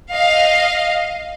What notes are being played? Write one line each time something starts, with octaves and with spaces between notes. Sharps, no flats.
D#5 F5